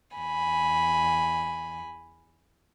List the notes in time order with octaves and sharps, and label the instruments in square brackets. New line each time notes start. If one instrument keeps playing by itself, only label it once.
[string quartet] E2 G#5 B5